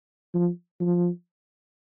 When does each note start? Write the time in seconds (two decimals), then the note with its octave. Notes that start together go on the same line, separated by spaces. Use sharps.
0.35 F3
0.81 F3